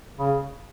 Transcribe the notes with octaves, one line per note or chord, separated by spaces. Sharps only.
C#3